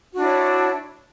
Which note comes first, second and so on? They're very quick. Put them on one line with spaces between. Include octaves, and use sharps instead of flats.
F#4 D4 E4 C#5